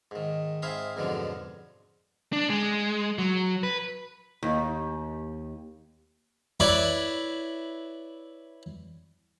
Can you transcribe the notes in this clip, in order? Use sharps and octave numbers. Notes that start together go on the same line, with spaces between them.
G#2 D#3
G#2 C4 G#4 E5 F5 B5
F2 G#2 B2 D3 F3 F#3
D4
G#3
F#3
B4
D#2
E4 B4 C#5 D5